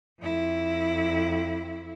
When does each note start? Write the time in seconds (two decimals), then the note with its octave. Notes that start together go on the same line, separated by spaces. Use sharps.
0.20 F2 E4